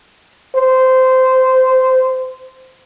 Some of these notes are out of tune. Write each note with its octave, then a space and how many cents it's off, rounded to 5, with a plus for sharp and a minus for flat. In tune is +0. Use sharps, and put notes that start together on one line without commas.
C5 -15